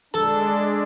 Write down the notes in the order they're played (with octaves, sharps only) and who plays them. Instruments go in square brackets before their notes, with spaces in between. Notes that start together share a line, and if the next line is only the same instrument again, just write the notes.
[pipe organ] G#3 D4 [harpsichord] A4